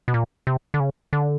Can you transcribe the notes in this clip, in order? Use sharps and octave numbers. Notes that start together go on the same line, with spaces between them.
B2
A#2
C3
D3
C#3
D3